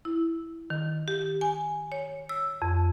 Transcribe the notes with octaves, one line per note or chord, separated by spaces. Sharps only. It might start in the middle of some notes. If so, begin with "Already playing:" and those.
E4
D#3
G4
G#5
C#5
E6
F2